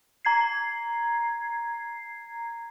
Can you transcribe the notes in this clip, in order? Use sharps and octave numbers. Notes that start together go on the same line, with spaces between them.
A#5 G#6 C7